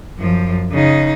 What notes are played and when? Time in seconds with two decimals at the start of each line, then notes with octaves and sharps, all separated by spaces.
0.18 F#2 F3
0.71 C#3 D#4